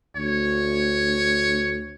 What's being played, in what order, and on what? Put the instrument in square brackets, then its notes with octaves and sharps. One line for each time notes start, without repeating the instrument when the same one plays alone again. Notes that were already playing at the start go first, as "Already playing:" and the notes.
[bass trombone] D2 [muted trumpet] C#5